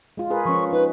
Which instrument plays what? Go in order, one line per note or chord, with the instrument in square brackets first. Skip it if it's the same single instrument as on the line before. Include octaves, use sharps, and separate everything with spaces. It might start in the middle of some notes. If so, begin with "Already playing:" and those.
[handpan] G#3 F4
G#4 A#4 B4
[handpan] F3 C#4 [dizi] C#6
[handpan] D#4 [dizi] B4